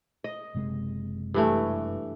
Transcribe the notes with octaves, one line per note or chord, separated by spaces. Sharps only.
D#5
F#1 C3 G#3
G2 E3 A3